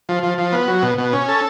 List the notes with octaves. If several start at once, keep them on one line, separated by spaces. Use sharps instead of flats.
F3
F3
F3
B3
F#3
B2
B2
C#4
A4